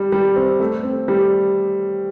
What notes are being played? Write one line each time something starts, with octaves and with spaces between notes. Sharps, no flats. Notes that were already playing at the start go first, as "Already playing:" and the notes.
Already playing: G3
G3
C4
A3
C4
G3